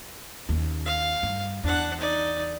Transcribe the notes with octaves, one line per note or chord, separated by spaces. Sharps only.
D#2 C#4
F5
G2
E2 D4 F#5
D#4 D5